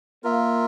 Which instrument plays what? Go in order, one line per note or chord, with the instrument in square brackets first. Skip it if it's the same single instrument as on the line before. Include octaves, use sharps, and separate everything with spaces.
[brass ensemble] A#3 [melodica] F4 A#4 E5